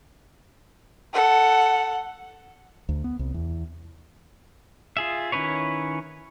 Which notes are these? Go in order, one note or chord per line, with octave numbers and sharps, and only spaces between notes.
A4 F#5
D2
B3
C2
E2
F4 G#4 E5
D#3 C#4 E4 B4 C#5